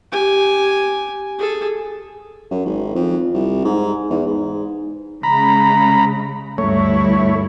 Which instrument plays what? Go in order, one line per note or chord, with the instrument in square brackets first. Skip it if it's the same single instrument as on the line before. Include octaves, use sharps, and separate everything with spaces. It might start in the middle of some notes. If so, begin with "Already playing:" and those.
[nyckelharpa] G4 G#5
G#4 A4
[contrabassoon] F#2
G#1
F2
C2
G#2
E2
G#2
[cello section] C#3 G#3 [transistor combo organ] A#5 B5
[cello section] D2 G2 E4 [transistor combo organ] A3 C#5